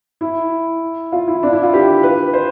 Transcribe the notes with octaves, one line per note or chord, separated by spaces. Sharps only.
E4
F4
E4
D4
E4
F4
G4
B4
C5